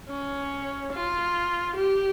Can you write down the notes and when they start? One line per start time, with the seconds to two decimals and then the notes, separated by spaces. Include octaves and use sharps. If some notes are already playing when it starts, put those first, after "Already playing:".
0.09 C#4
0.93 F4
1.76 G4